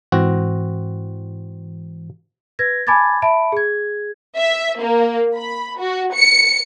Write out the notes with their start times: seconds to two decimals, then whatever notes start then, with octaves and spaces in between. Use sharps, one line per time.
0.12 G#2 E3 C4 F#4
2.59 B4 G#6 A#6
2.87 G#5 A5 B5 D6 G#6 A6
3.22 E5 A5 B5 D7
3.52 G#4 G#6
4.37 E5
4.81 A#3
5.35 B5
5.78 F#4
6.13 C#7